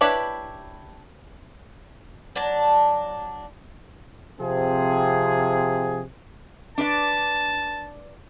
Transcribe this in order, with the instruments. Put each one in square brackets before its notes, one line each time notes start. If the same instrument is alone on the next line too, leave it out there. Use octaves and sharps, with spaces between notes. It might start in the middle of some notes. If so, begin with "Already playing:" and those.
[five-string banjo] D4 E4 G4 B4 C#5
[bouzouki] F#3 D4 A5
[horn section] C3 F3 C4 G#4
[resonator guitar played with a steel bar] D4 B4 D5 [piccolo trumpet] A5